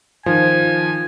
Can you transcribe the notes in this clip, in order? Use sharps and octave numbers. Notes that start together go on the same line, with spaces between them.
D#3 F3 G#5